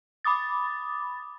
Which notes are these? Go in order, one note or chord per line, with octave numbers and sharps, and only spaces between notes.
B5 D6 D#6 A6